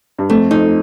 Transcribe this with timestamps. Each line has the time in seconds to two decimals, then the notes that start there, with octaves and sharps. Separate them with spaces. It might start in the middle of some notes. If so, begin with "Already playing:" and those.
0.18 G2
0.30 F2 A3
0.51 F2 D#4